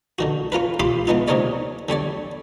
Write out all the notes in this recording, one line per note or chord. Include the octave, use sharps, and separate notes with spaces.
D3 D#3 F#4
C#4 F4 A#4 B4
F4 G4 B5 C6 D6
E3 G#3 B3 D#4 F4
D#2 C3 D#4 A#4 C#5 D5
D3 G3 C#5 D5